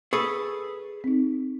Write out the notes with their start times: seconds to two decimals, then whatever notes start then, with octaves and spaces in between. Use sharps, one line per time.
0.13 G#4 A4 B4 C#6
1.04 C4 D#4